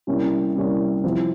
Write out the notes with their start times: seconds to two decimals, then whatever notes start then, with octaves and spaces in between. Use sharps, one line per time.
0.07 C3 G3 A#3 C#4 E4
0.56 C3 G3 A#3 C#4 E4
1.04 C3 F3 C4 E4